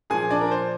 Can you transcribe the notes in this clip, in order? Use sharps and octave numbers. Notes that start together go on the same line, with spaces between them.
A#2 F3 G#4 G#5
D4 D5
A#4
C5